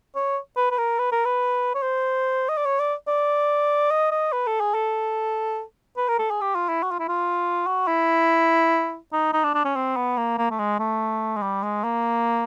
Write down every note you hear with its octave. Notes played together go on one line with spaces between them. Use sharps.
C#5
B4
B4
A#4
B4
A#4
B4
C#5
C5
D#5
D5
C#5
D5
D5
D#5
D#5
B4
A4
G#4
A4
B4
A#4
A4
G#4
G4
F4
E4
F#4
F4
E4
F4
F#4
E4
D#4
D#4
D4
D4
C#4
C4
B3
A#3
A#3
A3
G#3
A3
G#3
G3
G#3
A#3